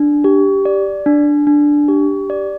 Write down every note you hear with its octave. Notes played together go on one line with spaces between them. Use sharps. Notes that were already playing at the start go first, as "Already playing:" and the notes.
Already playing: D4
G4
D5
D4
D4
G4
D5